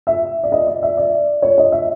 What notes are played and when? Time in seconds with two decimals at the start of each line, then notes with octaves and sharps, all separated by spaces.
0.07 E5
0.43 D5
0.52 D#5
0.67 D5
0.83 E5
0.97 D5
1.42 C#5
1.58 D#5
1.72 E5